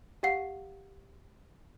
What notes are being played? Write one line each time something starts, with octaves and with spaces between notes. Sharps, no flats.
G4 F5 F#5 C7